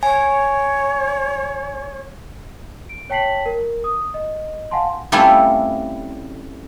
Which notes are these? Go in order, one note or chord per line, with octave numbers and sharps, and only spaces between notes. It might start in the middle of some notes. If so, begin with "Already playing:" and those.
C#5 G#5
D7
C#5 G5 A5 B6 C7 F#7
A#4
D#6
D#5
F5 F#5 G#5 A5 C6
G3 A3 C4 C#4 E4 F4